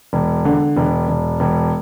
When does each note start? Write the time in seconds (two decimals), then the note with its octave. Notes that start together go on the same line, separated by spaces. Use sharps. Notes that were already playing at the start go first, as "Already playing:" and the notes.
0.13 E1
0.45 D3
0.77 E1
1.08 E1
1.40 E1